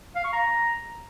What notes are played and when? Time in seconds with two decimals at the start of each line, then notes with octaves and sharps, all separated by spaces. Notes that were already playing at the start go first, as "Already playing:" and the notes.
0.16 F5
0.24 C#6
0.33 A#5